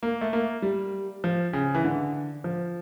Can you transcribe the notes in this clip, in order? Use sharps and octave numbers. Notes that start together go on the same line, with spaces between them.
A#3
A3
A#3
G3
F3
C#3
E3
D3
F3